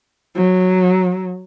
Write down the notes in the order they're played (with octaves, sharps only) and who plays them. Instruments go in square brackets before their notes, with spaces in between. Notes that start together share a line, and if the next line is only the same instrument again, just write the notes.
[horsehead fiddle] F#3